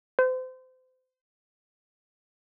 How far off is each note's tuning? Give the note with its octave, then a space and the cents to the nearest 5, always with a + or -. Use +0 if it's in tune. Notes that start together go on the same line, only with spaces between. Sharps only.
C5 -30